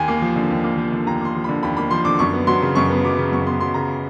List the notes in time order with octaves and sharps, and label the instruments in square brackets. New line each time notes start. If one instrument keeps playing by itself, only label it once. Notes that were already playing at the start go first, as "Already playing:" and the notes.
Already playing: [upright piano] D#2 G#5
A#3
F3
D3
D#2
A#3
F3
D3
D#2 A#5
A#3 C6
F3
D3 B5
D#2 B5
A#3 B5
F3 C6
D3 D6
F#2 C#6
B3
F#3 C6
C#3
F#2 C#6
B3
F#3 D6
C#3
F#2 C#6
B3 C6
F#3 C6
C#3 A#5